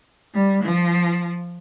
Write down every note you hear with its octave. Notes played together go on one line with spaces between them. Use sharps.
G3
F3